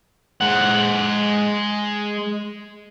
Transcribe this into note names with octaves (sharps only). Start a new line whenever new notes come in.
G#3 F#5